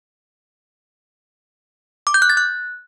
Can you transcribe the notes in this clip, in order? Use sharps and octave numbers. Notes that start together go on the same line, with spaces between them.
D6
G6
F#6
A6
F#6